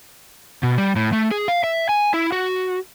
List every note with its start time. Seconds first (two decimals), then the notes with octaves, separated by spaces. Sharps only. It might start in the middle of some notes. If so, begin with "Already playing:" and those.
0.63 B2
0.78 G3
0.96 A2
1.13 A3
1.31 G#4
1.48 F5
1.64 E5
1.89 G#5
2.14 E4
2.32 F#4